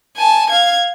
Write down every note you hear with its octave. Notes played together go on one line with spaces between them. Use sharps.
G#5 A5
F5 G#6